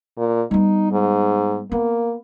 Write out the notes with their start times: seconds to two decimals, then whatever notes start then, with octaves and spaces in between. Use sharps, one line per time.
0.17 A#2
0.51 G3 B3 D#4
0.91 G#2
1.72 A#3 B3